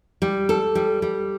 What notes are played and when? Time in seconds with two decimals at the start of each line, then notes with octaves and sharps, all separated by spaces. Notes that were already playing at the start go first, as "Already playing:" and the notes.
0.22 G3
0.49 A4
0.75 G3
1.02 G3